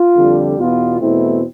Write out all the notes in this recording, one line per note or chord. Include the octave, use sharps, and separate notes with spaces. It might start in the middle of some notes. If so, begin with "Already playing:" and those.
Already playing: F4
F2 D3 G3
E2 B2 B3 F4
E2 B2 A3 C4 E4